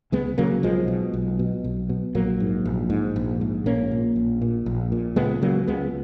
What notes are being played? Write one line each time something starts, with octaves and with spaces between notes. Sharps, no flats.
C#2 G#3 B3
C#3 F#3 A#3
B1 F3 G#3
B2
B1
B2
B1
B2
A#1 F#3 A#3
G#2
A#1
G#2
A#1
G#2
A#1 A#3 C#4
A#2
A#1
A#2
A#1
A#2
C#2 G#3 B3
C#3 F#3 A#3
C#2 G#3 B3